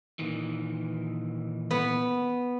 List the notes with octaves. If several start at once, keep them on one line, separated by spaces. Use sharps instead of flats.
A#2 D#3 E3
B3